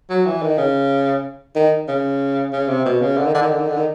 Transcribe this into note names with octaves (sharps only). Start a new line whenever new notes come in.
F#3
E3
D#3
C#3
D#3
C#3
C#3
C3
B2
C#3
D3
D#3
D3
D#3
D3
D#3
D3
D#3